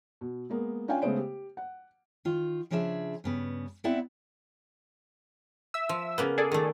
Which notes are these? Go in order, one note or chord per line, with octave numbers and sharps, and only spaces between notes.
B2
G#3 A#3 B3
C#4 D4 F4 F5 G5 G#5
C#3 G#3 A3 B3 C5 D7
G4
F#5
D#3 F4
C#3 F3 D4 G#4 D#5 E5
G2 C#3 B3
B3 C4 E4 D5 E5 F#5
E5 E6
F3
C#3 A#3 B3
G#4 A4 D5
D#3 A3